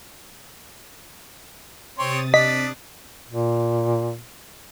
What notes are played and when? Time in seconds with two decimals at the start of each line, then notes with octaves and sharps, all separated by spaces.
1.99 C3 C4 C#5 C6 D#6 A6
2.34 D4 D#5 B6
3.28 A#2